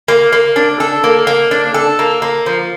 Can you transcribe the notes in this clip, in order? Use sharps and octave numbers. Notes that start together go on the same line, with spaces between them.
A#3
A#3
D4
A4
A#3
A#3
D4
A4
A#3
A#3
F3